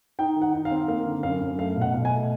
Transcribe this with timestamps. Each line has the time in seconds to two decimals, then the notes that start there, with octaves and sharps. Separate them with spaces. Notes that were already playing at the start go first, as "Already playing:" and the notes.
0.19 D#4 G5
0.36 D#3
0.42 F#5
0.53 D#4
0.65 F5
0.71 C4
0.88 A#3 F5
1.06 D3
1.23 F#2 F5
1.41 F#2
1.58 A3 F5
1.76 B2
1.81 F#5
1.94 B2
2.05 G#5
2.11 A3